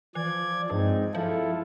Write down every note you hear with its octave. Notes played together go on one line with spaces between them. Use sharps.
E3 F3 D5 G#6
G2 G#3 C4 D#4
F3 E4 F4 A4